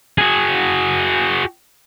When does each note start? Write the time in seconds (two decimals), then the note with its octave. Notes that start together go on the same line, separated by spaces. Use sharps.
0.18 F#4 G#4